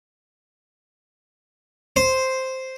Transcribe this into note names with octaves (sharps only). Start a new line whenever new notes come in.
C5